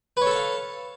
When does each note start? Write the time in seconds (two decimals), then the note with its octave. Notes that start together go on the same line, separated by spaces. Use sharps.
0.17 B4
0.22 C#5
0.26 A4
0.31 A5
0.36 F5